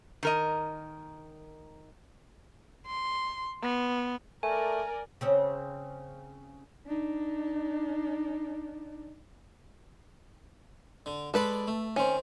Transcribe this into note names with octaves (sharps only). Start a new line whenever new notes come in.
D#3 A#4 D#5
C6
B3
A3 A#4 D5 G#5
C#3 C4 C#4
D4 D#4
D3
G#3 A4 B4 D5 B5
A3
D#3 C4 C#4